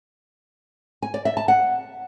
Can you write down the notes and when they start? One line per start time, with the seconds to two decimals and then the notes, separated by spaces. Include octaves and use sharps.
1.02 G#5
1.14 D5
1.25 E5
1.37 A5
1.48 F#5